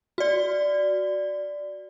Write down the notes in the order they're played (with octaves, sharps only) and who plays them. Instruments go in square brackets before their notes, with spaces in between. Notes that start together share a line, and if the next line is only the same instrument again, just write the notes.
[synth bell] F#4 D5